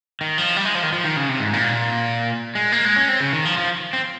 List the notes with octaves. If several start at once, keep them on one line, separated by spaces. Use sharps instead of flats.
D#3
F3
G3
G#3
F3
D#3
F3
D#3
C#3
C3
G#2
A#2
G#3
A#3
G#3
C#4
C4
C#3
D#3
F3
F3
C4